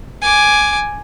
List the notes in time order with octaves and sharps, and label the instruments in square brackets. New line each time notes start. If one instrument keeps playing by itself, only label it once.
[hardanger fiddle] G#5 D6